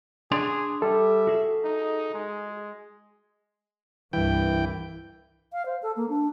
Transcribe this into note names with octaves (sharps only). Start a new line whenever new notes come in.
D4 G#4 D5 C6
G3 A4 E5
F#4 G#4
D#4
G#3
C2 G2 E3 G5
F5
C5
A4
A#3
D4